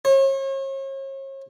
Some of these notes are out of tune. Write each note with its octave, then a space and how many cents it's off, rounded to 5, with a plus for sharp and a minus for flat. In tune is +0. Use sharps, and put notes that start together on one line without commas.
C#5 -40